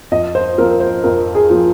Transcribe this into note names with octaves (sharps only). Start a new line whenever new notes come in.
F2 D#5
C5
F3 C4 F4 A#4
C5
F2 A#4
G#4
F3 C4 F4